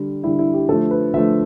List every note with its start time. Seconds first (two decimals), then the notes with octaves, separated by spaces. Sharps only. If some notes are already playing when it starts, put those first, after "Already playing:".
Already playing: D3 G3 D4
0.24 D3 G3 E4
0.39 E4
0.54 G4
0.69 D3 F3 A3 A4
0.91 B4
1.14 D3 F3 A3 E5